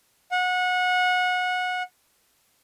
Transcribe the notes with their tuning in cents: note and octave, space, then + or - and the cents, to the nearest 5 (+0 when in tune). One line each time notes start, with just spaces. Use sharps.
F#5 -25